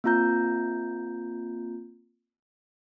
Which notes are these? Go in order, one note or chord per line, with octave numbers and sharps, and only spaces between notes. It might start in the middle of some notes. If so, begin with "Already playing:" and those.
A#3 C4 F4 A#5 G6